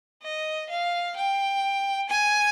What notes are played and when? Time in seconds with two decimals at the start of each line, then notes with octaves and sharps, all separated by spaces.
0.23 D#5
0.70 F5
1.16 G5
2.09 G#5